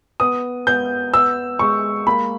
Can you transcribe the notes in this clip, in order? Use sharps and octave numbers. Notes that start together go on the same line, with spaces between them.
B3 D#6
B3 G6
B3 E6
G#3 C#6
A#3 B5